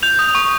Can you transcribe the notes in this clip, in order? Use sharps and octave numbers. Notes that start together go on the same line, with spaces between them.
G6 F7
D#6
C#6